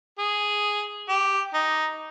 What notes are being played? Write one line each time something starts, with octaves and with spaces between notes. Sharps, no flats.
G#4
G4
D#4